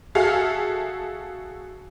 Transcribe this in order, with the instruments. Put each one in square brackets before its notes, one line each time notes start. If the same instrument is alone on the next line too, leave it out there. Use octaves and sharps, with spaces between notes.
[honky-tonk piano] F#4 G#4 A4 E5 F5 F6